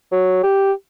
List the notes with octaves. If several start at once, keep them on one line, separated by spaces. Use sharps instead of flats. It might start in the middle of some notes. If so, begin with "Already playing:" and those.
F#3
G4